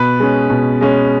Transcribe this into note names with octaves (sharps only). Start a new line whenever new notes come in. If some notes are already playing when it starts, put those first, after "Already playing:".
Already playing: B2 B4
G#3 C#4
B2
G#3 C#4